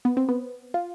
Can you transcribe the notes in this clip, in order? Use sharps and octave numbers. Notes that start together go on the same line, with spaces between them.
B3
C4
B3
F4